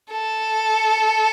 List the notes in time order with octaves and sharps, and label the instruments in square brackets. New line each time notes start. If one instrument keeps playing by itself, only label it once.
[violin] A4